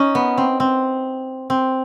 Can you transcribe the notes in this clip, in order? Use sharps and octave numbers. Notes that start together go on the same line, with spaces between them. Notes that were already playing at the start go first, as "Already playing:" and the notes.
Already playing: C#4 D#4
B3
C4
C4
C4